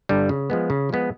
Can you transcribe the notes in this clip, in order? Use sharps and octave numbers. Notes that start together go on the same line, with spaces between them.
G2 D3 G3
C#3
F3 G#3 B3
C#3
F3 G#3 B3